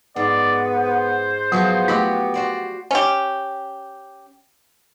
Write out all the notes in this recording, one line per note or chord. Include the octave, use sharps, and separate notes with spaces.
G#2 B3 D5
C5
F3 F#3 B3 F#4 G#4
A3 E4 F#4 G4 F#5
F#4 C5 D5
C#4 G4